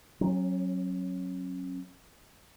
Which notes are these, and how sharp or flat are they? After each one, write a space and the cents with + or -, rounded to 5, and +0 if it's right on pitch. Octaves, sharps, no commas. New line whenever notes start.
F#3 +0 C#4 -35